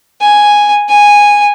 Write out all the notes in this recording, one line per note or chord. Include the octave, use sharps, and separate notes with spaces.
G#5
G#5